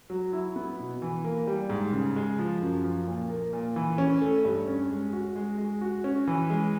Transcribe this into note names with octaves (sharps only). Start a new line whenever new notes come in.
F#3
E4
B3
B2
E3
A#3
G3
G#2
C#3
G#3
F3
F#2
F3
A#2
A#3
A#2
E3
C#4
A3
G2
C#4
G#3
F#4
G#3
G#3
F#4
C#4
E3
G#3